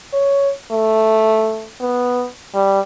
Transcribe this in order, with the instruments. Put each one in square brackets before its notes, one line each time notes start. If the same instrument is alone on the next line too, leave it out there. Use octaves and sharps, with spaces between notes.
[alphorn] C#5
A3
B3
G3